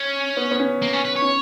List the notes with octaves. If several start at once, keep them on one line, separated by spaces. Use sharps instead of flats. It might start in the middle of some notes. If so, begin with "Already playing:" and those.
Already playing: C#4
B3
B3
C#4
A#3
C#4
B4
C#5
C#4